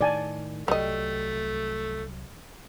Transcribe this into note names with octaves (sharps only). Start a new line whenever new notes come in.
A2 D#3 D5 G#5 A5
C2 F#3 G3 A3 D#5